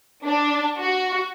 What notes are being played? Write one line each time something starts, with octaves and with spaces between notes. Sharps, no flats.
D4
F#4